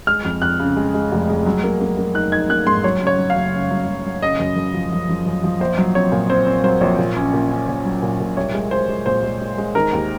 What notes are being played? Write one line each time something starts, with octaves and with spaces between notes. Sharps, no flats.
G#3 F6
F2
F2 F#6
C#3
G#3
G#3
F1
G#3
F#3
A#3
A#3
A#3
D#4 F#6
D#4 G#6
A#3 F#6
G#2 C6
F#3 C#5
C#3
C#5
F#3
F5
F#1
C#3
F#3
F#3
F#3
C#3 D#5
F#2
F#2
F3
F3
F3
F#2
F3
A#1 C5
F#3
C4 C#5
A#2
C4 C5
C4
F#3 C5
A#1 C#5
A#2
C#4
A#2
C#4
A#2
F#3
A#2
A#2
C2 C#5
G#3
G#3 C5
G#3
A#2 C5
G#3
G#3
G#3
D#3 A#4
D#2